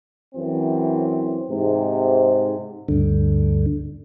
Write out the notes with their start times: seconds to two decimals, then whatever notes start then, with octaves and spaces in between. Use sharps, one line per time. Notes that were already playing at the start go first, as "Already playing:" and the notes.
0.35 F#2 E3 C4
1.50 G#2 C3
2.88 D2 G2 D3